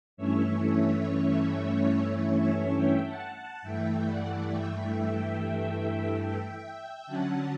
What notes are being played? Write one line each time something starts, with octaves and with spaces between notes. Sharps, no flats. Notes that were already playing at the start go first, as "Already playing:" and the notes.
G2 E3 A3 C#4 C#5 E5
E5 G5
F#5 A5
F#5 A5
G2 E3 A3 E5 G5
D5 F#5
E5 G5
E5 G5
D3 F#3 C#4 F#5 A5